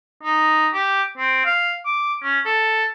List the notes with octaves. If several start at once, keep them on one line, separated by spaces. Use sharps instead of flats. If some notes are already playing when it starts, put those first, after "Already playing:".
D#4
G4
C4
F5
D6
C#4
A4